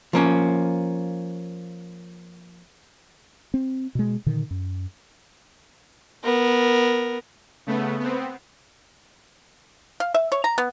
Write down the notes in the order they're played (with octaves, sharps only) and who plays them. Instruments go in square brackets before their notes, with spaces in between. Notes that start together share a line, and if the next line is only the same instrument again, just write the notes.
[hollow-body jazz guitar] F3 A#3 C#4
[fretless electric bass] C4
B2 G#3
A#2 D3 D#3
F#2
[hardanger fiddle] B3 A#4
[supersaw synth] C#3 A3 B3
B3 C4
[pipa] F5
E5
C#5
A#5
B3